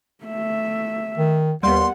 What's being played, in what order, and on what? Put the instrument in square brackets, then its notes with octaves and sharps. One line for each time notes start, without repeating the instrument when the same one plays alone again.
[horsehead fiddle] A3 E5
[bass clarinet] D#3
[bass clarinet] D#2 [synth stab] G3 A#3 B3 [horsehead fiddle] F#5 [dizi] C6